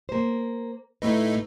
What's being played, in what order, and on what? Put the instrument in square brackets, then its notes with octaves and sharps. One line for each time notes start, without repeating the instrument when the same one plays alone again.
[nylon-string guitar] A#3 C5
[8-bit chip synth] A2 A3 D#4 [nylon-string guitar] B4